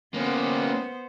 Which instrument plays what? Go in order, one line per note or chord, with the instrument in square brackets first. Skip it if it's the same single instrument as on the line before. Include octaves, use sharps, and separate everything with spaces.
[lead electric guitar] A#3 C#4 [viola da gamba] B3 C5